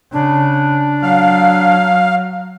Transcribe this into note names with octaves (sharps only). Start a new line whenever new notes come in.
C#3 D4
F#3 F5